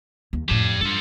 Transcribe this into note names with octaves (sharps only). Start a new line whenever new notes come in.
D#2
F2 A2 G4 A5
G2 F4 A4